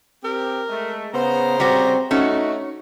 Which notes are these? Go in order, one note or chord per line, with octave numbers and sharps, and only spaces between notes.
C4 G4 A#4
G#3 A3
C#3 B3 C5 A#5
G3 C4 F#4
A3 C#4 D#4 F#4